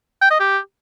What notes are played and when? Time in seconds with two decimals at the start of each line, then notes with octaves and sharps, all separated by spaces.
0.21 G5
0.31 D#5
0.40 G4